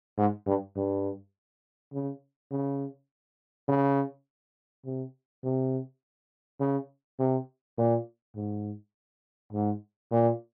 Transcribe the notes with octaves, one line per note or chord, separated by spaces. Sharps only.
G#2
G2
G2
C#3
C#3
C#3
C3
C3
C#3
C3
A#2
G#2
G#2
A#2